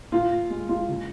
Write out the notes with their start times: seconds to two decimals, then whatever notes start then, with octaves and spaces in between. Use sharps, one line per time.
0.12 A#2 F4
0.31 A#2
0.50 G#3
0.69 G#3 F4
0.89 C#3